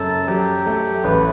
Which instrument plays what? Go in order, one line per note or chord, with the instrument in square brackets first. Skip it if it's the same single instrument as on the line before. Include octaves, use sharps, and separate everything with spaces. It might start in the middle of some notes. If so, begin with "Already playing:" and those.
Already playing: [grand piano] F#1 F#2 [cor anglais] A4
[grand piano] F#3 [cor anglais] G4
[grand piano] A3
[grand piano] A1 [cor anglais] B4